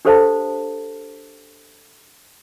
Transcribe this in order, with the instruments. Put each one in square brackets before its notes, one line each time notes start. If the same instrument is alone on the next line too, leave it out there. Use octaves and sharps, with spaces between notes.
[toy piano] D4 G4 A4 C5 F5 A5